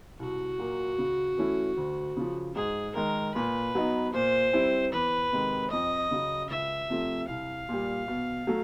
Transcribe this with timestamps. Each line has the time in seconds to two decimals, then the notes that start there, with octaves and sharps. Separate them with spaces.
0.19 C2 F#4
0.59 A#2 F#3 A#3
0.98 C#3
1.37 E3 A3 C#4 E4
1.77 D2
2.16 C#3 F3
2.55 G#2 G#4
2.95 D#3 G#3 A#4
3.35 A#2 B4
3.75 F#3 B3 D#4
4.13 A#2 C5
4.53 G3 C4 E4
4.92 E2 B4
5.32 C3 D#3 G#3
5.71 F2 D#5
6.11 C#3 F#3
6.50 C#2 E5
6.90 C3 F3 A3
7.29 C2 F5
7.69 A#2 G3
8.08 B2
8.47 F#3 A3